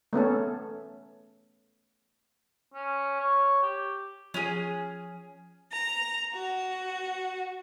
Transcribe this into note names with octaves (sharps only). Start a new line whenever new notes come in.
A3 B3 C#4 A4
C#4
C#5
G4
F3 C#4 G#4
A#5
F#4